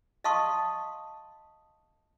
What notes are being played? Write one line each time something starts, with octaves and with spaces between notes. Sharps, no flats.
D#5 F5 A5 C6 C#6 D#6